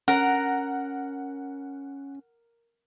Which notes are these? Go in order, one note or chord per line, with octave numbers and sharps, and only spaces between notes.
C#4 A#4 F#5